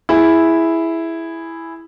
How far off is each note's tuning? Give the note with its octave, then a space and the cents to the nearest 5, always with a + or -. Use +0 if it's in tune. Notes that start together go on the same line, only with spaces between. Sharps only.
E4 +0 G#4 +0